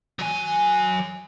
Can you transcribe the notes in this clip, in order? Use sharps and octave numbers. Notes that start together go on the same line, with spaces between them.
F#3 G#5